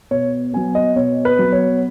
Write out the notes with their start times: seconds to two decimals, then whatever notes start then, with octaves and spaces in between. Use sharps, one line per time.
0.11 B2 C#5
0.53 F#3 B3 G#5
0.75 D#5
0.96 B2 C#5
1.25 B4
1.39 F#3 B3
1.52 C#5